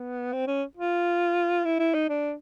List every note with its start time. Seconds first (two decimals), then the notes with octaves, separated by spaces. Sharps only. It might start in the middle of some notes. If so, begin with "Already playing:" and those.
Already playing: B3
0.33 C4
0.48 C#4
0.77 F4
1.65 E4
1.80 E4
1.94 D#4
2.10 D4